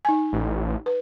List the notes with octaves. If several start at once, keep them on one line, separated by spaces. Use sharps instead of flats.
D#4 G#5
A1
B4